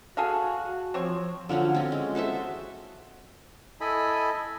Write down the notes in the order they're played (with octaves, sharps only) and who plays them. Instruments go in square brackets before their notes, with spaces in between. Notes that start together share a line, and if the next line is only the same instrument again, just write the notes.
[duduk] F#4 [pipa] G#4 A4 F5
[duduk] F3 [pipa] C4 C5 C#5
[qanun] D3 F3 F#3 C#4
C4 C#4
G#3
F#4 A4 C5 E5
[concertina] E4 A4 D#5 G#5 B5